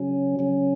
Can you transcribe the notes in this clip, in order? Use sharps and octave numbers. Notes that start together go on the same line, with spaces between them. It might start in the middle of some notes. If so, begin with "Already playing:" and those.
Already playing: C#3 F#3 C#4
C#3 F#3 C#4